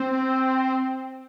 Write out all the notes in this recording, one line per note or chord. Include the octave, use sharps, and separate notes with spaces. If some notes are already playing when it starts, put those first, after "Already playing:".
Already playing: C4